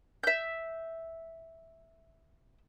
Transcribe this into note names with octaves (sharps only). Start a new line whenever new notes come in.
E5 G6